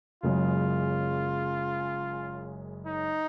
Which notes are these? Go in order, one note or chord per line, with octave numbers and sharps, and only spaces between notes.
F#1 F#2 C#3 G#3 F4
D#4